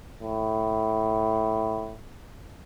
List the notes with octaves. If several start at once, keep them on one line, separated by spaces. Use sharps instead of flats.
A2